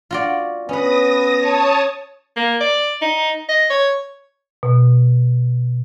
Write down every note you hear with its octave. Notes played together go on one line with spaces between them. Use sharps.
F4 F#4 D5
B3 C#4 B4 D#6 A#6
C#5 A5 D#6
A#3
D5
D#4
D#5
C#5
B2